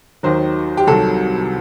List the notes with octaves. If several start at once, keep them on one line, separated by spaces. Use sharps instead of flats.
D#2 D#3 F#3 C5
G4
C2 C3 D#3 F#3 A4